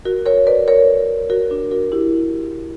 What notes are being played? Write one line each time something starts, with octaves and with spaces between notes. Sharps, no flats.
F#4 A#4
A#4 C#5
B4 D5
A#4 C#5
F#4 A#4
D4 F#4
F#4 A#4
E4 G4